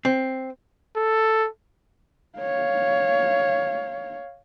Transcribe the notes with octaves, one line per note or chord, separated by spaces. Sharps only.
C4
A4
C#5 F5